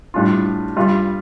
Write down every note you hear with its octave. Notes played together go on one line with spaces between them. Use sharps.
A2 G3 D4 F4
G2 G3 F4